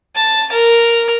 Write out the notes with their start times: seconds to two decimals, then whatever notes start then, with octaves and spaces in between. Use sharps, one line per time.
0.15 A5
0.52 A#4